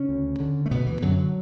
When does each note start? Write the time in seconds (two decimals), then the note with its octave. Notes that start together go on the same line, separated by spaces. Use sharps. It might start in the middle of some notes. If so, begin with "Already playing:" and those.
Already playing: C#3 C#4
0.09 D2
0.40 D3
0.66 A3
0.71 D2 B2 B3
0.86 E3
1.02 F#2 D3 F#3
1.18 F#3